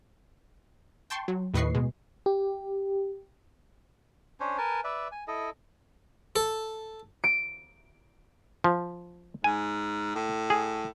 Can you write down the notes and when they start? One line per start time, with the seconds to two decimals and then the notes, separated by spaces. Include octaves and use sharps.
1.10 G5 A5 C6 C#6
1.28 F#3
1.54 D#2 A2 B4 D#5 C#6 C7
1.75 B2 G#3
2.26 G4
4.40 C#4 D4 C5 C#5
4.58 A#4 B4 G#5 A5
4.84 B4 D5 E5
5.12 G#5
5.28 E4 A4 D#5
6.36 A4
7.24 D7
8.64 F3
9.44 G#2 G#5
10.15 A2
10.50 G#4